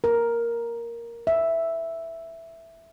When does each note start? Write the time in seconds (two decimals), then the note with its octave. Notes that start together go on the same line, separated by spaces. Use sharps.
0.04 A#4
1.27 E5